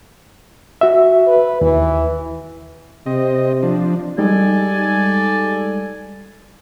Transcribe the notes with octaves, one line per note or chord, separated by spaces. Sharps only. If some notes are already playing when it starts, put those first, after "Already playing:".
F#4 E5
B4
D#2 E3
C3 C4 D#5
F3 D4
G3 G#3 D#4 A4 D5 G#5